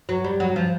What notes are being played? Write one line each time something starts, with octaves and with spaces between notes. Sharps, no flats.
F#3
G3
F#3
F3